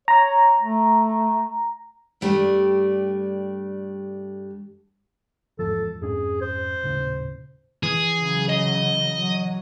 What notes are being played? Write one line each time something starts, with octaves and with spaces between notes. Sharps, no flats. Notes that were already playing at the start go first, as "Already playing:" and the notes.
C#5 A#5
A3
G2 G3 A3 B3 D4
E2 G#2 F3 A4
F2 G#2 C#4 G#4
C5
D#1 A2 C#3
E3 G#4
C#3 F#3
D#5
F#3